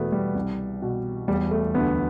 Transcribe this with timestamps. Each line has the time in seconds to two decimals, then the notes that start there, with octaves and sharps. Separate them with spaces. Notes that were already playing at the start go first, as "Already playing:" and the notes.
Already playing: E1 E2 B2 A3 B3
0.12 G3
0.35 C2
0.82 B2
1.28 E1 G3
1.51 A3
1.74 D2 B3
1.77 D3